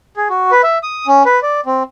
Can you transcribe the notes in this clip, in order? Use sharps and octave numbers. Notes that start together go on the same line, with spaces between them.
G#4
F#4
B4
E5
D#6
C#4
B4
D5
C4